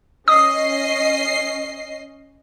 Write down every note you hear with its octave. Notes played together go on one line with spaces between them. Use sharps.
C#4 D#5 D#6 C7